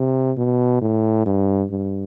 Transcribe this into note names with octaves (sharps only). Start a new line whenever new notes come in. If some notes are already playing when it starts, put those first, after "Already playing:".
Already playing: C3
B2
A2
G2
G2